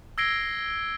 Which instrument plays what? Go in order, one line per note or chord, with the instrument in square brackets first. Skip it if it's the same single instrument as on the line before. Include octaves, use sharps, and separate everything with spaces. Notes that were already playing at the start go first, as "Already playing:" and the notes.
[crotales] E6 G#6 A#6 C7 D7 G7